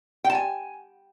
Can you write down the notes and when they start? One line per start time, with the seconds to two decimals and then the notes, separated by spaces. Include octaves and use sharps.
0.24 G5
0.30 A5
0.35 G#5